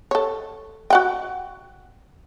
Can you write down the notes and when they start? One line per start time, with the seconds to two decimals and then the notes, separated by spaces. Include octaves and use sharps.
0.11 A4 C#5
0.90 F#4 F#5 G5